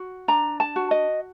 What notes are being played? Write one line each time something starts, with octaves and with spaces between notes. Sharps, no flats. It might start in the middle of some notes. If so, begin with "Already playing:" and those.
Already playing: F#4
D4 A#5
A5
F#4
D#5